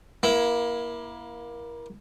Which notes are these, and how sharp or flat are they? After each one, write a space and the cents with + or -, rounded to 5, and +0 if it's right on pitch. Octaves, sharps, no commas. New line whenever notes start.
A#3 +25 E4 +0